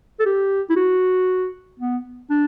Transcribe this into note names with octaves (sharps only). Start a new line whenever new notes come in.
A4
G4
E4
F#4
B3
D4